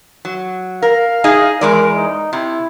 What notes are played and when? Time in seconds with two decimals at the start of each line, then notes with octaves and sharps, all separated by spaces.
0.25 F#3
0.82 A#4 F5
1.24 D#4 G#4 D#5
1.61 E2 G#3 A#4 D5
1.96 D#4
2.33 C3 E4